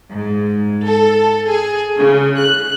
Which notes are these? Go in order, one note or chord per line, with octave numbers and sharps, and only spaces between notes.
G#2
A4
G#4
C#3
F#6